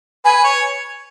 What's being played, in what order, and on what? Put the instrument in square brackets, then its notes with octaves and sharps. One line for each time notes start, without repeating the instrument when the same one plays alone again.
[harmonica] B4 [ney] G#5
[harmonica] C#5